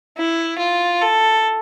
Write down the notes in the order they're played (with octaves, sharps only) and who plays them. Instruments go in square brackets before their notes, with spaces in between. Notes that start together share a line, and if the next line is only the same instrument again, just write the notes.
[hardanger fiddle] E4
F4
A4